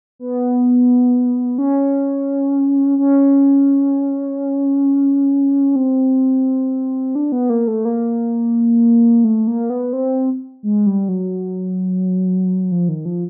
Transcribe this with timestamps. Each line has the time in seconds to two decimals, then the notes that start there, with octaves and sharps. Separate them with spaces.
0.19 B3
1.58 C#4
2.99 C#4
5.76 C4
7.15 D4
7.32 B3
7.50 A#3
7.68 A3
7.85 A#3
9.24 A3
9.47 A#3
9.70 B3
9.93 C4
10.63 G#3
10.87 G3
11.08 F#3
12.72 F3
12.89 D#3
13.05 F3